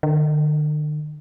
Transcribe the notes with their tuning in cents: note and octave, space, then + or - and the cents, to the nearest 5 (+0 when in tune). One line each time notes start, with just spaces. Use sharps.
D3 +45